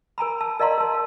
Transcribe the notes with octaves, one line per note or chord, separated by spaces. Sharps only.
A#4 G#5 A#5 B5
A5
A#4 D5 D#5 F5 A#5 C6
A#4 A5